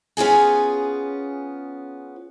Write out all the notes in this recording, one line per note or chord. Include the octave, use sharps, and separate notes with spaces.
B3 C#4 F4 G#4 G#5